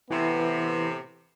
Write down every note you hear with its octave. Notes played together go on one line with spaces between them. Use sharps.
A2 C3 E3 B3 E4